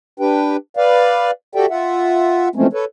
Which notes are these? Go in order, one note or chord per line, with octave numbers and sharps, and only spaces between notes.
D4 G4 B4 G5
B4 D5 F5
F#4 G4 A4 D5 E5 G5
F4 E5 F#5
E3 F3 G#3 A3 C4 C#4
A4 B4 C#5